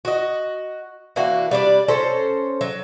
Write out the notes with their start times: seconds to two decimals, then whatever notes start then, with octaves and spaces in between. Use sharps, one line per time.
0.05 F#4 D#5
1.16 E3 A#3 D4 F#4
1.51 G3 D4 D5
1.88 C#4 A4 C5 A#5
2.61 F#3